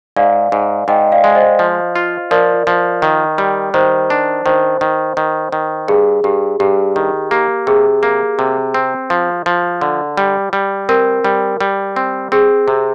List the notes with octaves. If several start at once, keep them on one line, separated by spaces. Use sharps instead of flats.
G#2 D5 F5
G#2
G#2 D#5 G5
D5 F5
G#3
C5 D#5
F3
F4
F3 A#4 D5
F3
D#3
G3
D#3 C5
D4
D#3 C5
D#3
D#3
D#3
G2 G#4
G2 G4
G2 G4
D#3
A#3 G4
C3 G#4
A#3
C3
C4
F3
F3
D3
G3
G3
C4 A#4
G3
G3
C4
C4 G#4
C3